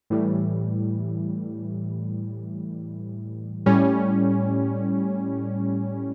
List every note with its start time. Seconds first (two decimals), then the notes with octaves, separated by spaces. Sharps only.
0.10 A2 E3 G3
3.66 A2 G3 C#4